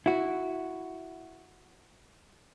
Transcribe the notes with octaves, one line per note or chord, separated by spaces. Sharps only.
E4 F#4